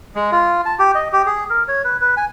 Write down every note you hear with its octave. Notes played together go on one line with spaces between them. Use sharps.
G#3
F4
A5
G4
D#5
G4
G#4
A#4
C#5
B4
B4
G#5